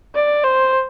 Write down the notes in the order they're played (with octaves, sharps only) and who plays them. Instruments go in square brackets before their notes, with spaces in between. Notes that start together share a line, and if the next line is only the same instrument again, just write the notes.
[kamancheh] D5
C5